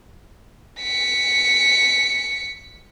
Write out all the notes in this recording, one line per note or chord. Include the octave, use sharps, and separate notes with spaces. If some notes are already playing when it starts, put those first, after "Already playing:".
B6 C#7